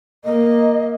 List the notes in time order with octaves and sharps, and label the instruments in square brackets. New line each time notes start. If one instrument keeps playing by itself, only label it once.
[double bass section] A#3 [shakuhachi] D#5